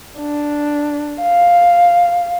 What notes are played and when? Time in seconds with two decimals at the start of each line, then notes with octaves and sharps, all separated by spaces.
0.19 D4
1.22 F5